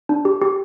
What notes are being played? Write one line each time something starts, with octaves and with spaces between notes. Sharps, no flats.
D4
G4
G4